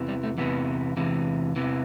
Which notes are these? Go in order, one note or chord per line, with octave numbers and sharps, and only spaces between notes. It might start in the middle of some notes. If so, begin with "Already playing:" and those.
Already playing: E2 C3 E3
G3
A3
E2 C3 E3 B3
E2 C3 E3
E2 C3 E3